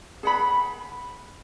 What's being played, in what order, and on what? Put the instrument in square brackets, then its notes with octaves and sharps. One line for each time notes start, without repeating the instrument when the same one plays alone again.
[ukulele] G#4 F#5 B5